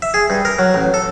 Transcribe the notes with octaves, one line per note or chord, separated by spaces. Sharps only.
E5
G#4
G2
A#4
F#3
A1
A4